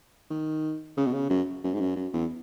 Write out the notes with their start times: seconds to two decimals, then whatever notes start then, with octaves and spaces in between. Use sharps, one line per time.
0.30 D#3
0.97 C#3
1.06 B2
1.13 C#3
1.30 F#2
1.64 F#2
1.74 G#2
1.80 F#2
1.96 F#2
2.13 E2